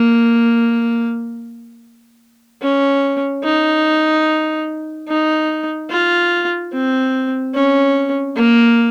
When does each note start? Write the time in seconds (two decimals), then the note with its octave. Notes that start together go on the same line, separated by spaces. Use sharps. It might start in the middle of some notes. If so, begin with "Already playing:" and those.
Already playing: A#3
2.62 C#4
3.44 D#4
5.08 D#4
5.90 F4
6.72 C4
7.54 C#4
8.36 A#3